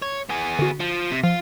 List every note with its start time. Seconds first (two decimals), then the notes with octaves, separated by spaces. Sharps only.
0.02 C#5
0.29 B3 G#4
0.59 D3 F#4
0.80 F3
1.11 C3
1.24 F3 F4